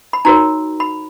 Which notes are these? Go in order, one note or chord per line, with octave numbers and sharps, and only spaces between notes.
B5
D#4 F#4 A#4 C#5 A#5
B5